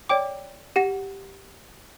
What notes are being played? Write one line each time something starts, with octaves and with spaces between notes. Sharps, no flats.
C#5 D5 G5 D6
G4 F#5 A#6